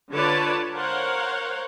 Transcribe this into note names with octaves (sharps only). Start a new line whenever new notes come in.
D3 F4 B4 C#5 D5 A5
A#4 C5 C#5 F5 F#5